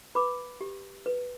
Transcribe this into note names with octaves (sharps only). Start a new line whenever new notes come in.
B4 B5 D6
G4
B4